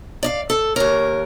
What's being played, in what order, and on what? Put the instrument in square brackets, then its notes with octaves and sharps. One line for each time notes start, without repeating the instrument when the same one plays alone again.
[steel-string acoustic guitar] D5 D#5 F5
A4
[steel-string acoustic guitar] D#2 A#4 [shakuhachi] C#5